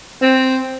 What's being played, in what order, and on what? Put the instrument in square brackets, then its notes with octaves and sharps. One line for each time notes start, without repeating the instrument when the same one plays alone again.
[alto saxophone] C4